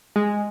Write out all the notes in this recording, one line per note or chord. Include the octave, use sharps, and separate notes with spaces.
G#3